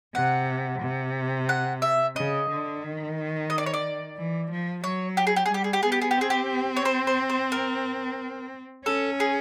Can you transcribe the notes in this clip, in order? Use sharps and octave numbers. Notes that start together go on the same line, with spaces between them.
C3 F#5
C3
F#5
E5
C#3 D#5
D3
D#3
D#5
D5
C#5
D5
E3
F3
F#3 C#5
G4
G#4
G4
G#4
G3 G4
G#4
G4
B3 G#4
G4
G#4
G4
C4 G#4
G4
C#5
C5
C5
C5
A#4
C#4 A4
G#4